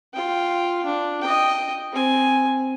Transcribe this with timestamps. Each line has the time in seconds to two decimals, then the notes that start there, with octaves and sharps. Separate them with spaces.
0.14 F4 G5
0.85 D4
1.22 D#5 G5
1.92 C4 G#5